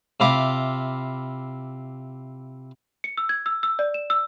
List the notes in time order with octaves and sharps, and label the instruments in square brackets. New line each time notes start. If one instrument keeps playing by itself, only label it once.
[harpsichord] C3 E4 F4 D6
[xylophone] C#7
E6
G#6
E6
E6
D5
E7
E6